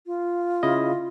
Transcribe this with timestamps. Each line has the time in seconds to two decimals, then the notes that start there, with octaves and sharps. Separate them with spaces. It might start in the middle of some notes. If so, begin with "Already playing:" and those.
0.06 F4
0.63 C#3 E4 D#5